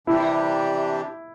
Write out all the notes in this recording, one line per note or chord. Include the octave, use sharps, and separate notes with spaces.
C3 E3 G3 D4 E4 G4